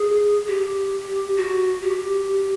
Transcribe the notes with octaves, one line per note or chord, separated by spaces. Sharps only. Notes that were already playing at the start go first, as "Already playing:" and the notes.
Already playing: G#4
G4
F#4
G4